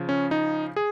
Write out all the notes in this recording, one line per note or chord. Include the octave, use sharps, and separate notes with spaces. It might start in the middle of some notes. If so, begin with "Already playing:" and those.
Already playing: C#3 F3
C#4
D#4
G#4